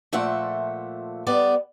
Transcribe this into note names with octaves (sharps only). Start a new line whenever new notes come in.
A#2 F3 A3 E5 F#5
G3 B3 D5